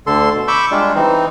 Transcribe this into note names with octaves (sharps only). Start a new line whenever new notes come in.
D2 D3 A4 C6
B2
B5 C#6 D6 E6 G6
G3 G#3 D4 F4
E3 C4 D#4